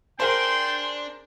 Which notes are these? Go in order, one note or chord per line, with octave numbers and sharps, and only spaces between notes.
D4 G#4 A#4 C5 G5 C6